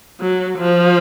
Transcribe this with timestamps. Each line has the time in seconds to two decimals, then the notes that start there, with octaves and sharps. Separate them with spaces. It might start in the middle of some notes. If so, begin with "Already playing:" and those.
0.21 F#3
0.59 F3